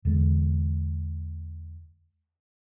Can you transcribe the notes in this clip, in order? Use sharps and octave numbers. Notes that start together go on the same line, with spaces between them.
E2 D3 G#3